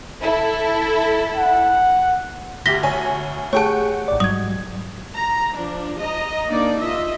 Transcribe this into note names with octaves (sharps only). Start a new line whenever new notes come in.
E4 A4
F#5
D2 G4 A#6 B6 G7
D2 C#5 G#5
A3 G4 G#4 C#5 F#5 G5 A5 C#6
A1 D5
G#2 F#3 G3 D#6 G#6
A#5
F3 D4
D#5 A#5
A#3 D4 D#4 D5
F4 D#5 E5